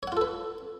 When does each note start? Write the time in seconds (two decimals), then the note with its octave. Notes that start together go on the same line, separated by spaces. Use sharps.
0.03 C#5
0.07 F#5
0.12 F4
0.17 A4
0.21 B4